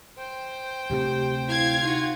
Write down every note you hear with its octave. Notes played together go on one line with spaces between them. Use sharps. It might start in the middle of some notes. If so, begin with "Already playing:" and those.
C5 G5
D2 C3 A3 G4
E4 F5 G#6
D#4 F4 F#4